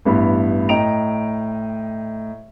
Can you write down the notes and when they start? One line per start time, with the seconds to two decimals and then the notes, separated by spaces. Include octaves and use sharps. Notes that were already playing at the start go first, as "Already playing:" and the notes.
0.05 A1 G2 B3 E4 B5
0.69 A2 D#5 G5 A#5 D7 F7